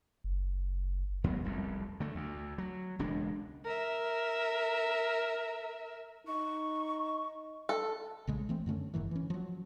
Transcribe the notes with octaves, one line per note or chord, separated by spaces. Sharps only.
F#1
D#2 F#3 B3
F1 C2 F2
D3 A3
D2
F#3
E1 C#2 G#3 D4
A#4 E5
D#4 C#6
A4
A#1 C#3 G#3
E3 A3 C4
F#2 D3 A3 C#4
F#1 G#2 D#3 E3
E3 C#4
F3 F#3